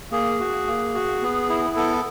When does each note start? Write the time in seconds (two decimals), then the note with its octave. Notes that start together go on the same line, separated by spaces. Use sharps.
0.11 A#3 G#4
0.40 F#4
0.67 A#3
0.94 F#4
1.22 B3
1.49 E4
1.76 B3 A4